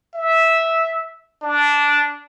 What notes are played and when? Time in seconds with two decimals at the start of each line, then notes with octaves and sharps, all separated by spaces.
0.14 E5
1.42 D4